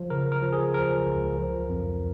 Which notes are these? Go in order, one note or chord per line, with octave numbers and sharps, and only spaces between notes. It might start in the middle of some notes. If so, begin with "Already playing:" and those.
Already playing: F3
C#3 A#4
A#4
F3
G#4
F3 A#4
C#2
F3
F2